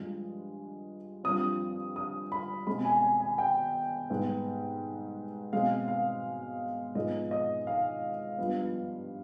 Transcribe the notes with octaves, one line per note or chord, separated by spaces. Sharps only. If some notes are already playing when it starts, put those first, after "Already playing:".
Already playing: G2 F3 G#3
G2 F3 C4 D#6
D#6
B5
B2 G#3 C4 B5
G#5
G#5
G#5
G5
G#2 G3 B3
B2 G#3 C4 F5
F5
G#2 F3 G#3 B3 D#5
D#5
F5
G2 F3 B3